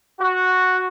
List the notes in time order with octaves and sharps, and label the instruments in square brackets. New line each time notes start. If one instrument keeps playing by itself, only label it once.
[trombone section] F#4